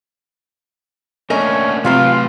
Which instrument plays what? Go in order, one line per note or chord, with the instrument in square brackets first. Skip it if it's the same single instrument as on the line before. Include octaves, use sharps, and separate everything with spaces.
[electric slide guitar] A3 A#3 D4 [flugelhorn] C#4 [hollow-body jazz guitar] A#4 D#5 G#5
[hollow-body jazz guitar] C3 F#3 C4 [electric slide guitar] E3 A3 B4 [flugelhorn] F4